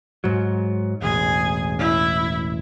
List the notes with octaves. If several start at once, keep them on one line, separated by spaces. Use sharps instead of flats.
G#2 F#3
E1 A1 G#4
E4